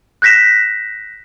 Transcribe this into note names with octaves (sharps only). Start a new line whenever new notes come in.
F#6 G6 A#6 B6 E7